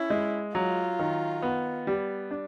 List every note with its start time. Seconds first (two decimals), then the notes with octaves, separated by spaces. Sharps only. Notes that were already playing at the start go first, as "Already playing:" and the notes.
Already playing: C#4 E4
0.10 G#3
0.55 F#3 F4
0.99 D#3
1.42 B3
1.87 G3
2.31 D4